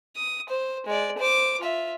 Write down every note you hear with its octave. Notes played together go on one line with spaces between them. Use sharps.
D#6
C5
G#3 D5
C5 D6
F4 E5